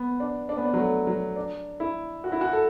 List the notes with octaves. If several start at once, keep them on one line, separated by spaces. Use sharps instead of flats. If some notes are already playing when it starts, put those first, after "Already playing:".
Already playing: B3
D4
D4
B3
D4
F#3
A3
F#3
D4
E4
F#4
E4
F#4
A4